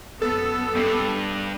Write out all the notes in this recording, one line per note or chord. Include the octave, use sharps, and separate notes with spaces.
F#2 B3 A4
G2